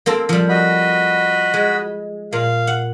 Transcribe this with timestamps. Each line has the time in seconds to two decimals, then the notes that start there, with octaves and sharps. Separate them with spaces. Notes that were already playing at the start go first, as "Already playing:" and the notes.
0.06 A#3 C4 A4
0.29 F3 G3
0.49 F#4 D#5 B5
1.54 G#3
2.33 A#2 F5
2.67 F#5